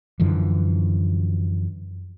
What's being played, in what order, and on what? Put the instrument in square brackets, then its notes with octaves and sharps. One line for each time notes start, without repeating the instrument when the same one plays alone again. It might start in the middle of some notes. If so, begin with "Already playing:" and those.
[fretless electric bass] F#2 D3 E3 F3